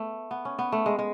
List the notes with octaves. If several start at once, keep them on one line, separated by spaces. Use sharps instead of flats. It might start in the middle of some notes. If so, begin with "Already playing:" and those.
Already playing: A3 B3
B3
C#4
B3
A3
G#3
G#3